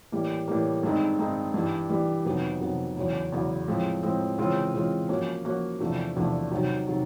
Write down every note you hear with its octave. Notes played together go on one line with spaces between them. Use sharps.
A2 E3 G3 A#3
A2 E3 G3 A#3
G2 D#3 G#3 C4 D#4
G2 D#3 G#3 C4 D#4
G2 E3 G3
G2 E3 G3
F2 C3 D#3 F#3 B3
F2 C3 D#3 F#3 B3
E2 C#3 F#3
E2 C#3 F#3
A2 F3 G#3 C4
A2 F3 G#3 C4
C#3 E3 G#3 C4 F4
C#3 E3 G#3 C4 F4
F3 A#3 C#4 F#4
F3 A#3 C#4 F#4
E2 C3 F3 A3 D4
E2 C3 F3 A3 D4
C3 D#3 F#3
C3 D#3 F#3